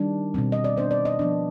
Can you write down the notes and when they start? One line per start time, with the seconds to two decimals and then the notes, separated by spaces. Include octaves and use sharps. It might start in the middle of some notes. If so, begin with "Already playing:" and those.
Already playing: D#3 G3 D4
0.34 B2 G3 C4
0.52 D#5
0.64 D5
0.77 D#3 B3 D4 C5
0.91 D5
1.05 D#5
1.19 F3 B3 D4